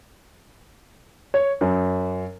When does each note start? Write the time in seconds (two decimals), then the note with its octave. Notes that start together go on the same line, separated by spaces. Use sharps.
1.34 C#5
1.61 F#2